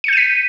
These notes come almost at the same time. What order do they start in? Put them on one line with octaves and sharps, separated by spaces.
C#7 G6 D#7 B6